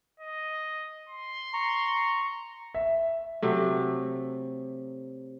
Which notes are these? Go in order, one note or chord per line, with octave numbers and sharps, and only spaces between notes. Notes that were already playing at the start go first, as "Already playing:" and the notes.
D#5
C6
A#5 C#6
E5
C3 F#3 A3